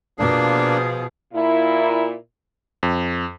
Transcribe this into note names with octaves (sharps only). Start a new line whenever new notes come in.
B2 F3 A#3 D4 G#4
A#2 E4
F2